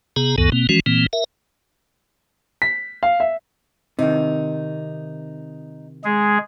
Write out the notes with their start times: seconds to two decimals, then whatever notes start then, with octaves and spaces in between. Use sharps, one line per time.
0.16 C3 B3 G#4 A#5
0.38 C#2 F#2 D#3 B3 A4
0.52 B2 A#3 C4
0.69 E3 F3 G#3 C#4 F#4
0.86 A#2 E3 A#3 C4
1.13 A#4 E5
2.62 B6
3.03 F5
3.20 E5
3.99 C3 D#3 D#4
6.04 G#3 G#4